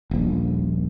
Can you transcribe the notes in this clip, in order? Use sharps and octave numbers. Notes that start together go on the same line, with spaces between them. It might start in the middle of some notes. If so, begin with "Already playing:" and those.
D#1 A#1